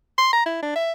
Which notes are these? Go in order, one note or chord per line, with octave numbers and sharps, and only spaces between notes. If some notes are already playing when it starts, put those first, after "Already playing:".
C6
A#5
E4
D4
E5